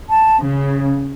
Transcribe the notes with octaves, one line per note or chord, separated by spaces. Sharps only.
A5
C#3